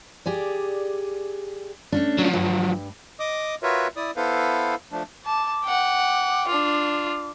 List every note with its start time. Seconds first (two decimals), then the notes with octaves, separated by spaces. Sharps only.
0.26 G4 G#4 D5
1.92 A3 C#4 D4
2.18 F3 F#3
2.34 G2
3.20 D#5 D6 D#6
3.63 F4 F#4 A#4 B4 C#5 E5
3.96 E4 D5 D#6
4.16 B3 E4 A4 B4 C5 F5
4.92 F3 A3 D4
5.25 A5 D6
5.65 F#5 G5
6.48 D4 F4